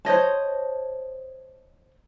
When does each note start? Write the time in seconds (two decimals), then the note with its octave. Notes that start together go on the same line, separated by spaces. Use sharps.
0.05 C5 C#5 D#5 A5